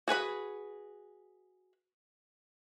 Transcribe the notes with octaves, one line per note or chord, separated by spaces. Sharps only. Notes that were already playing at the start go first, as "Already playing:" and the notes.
F#4 G#4 B4 B5